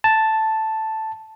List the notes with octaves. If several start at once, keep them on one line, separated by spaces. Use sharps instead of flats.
A5